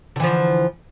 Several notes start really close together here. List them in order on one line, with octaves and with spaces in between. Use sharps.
D3 E3 F3